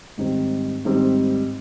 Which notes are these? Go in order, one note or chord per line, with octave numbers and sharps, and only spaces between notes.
G#2 D#3 G3 C4
G#2 D#3 G3 C4